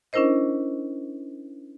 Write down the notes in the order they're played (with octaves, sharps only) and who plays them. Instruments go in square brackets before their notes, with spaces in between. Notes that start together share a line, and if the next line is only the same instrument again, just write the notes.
[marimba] C#4 D4 E4 A#4 C5 D#5